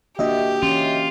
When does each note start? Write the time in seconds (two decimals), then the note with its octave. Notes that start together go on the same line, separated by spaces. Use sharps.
0.19 A#3 D4 F#4 G4 D#5 E5
0.63 E3 C#4 F4